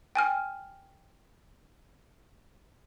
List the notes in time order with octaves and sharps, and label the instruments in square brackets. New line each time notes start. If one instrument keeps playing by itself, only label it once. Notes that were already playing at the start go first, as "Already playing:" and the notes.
[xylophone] G5 G#5 F6